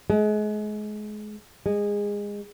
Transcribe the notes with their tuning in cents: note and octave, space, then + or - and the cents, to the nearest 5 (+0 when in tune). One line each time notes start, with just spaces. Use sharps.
G#3 +30
G#3 -20